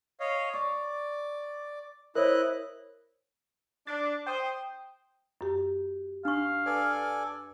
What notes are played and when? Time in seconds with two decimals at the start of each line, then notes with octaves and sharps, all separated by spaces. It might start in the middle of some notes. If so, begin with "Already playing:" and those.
0.20 C#5 D#5 F5
0.54 D5 C#6
2.15 E4 A#4 C5 C#5 D#5 F#6
3.87 D4 A6
4.27 C5 G5 D#6
5.41 F#2 G4
6.25 D4 F5 C#6
6.66 A4 B4 D5 G#5